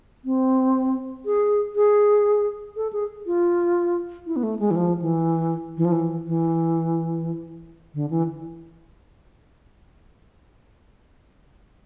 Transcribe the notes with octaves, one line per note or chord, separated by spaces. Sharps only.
C4
G#4
G#4
A4
G#4
F4
E4
B3
A3
G#3
E3
F3
E3
E3
F3
E3
E3
D3
E3